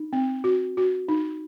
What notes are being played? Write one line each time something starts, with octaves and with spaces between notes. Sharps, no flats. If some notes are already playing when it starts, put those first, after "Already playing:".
Already playing: D#4
C4
F#4
F#4
D#4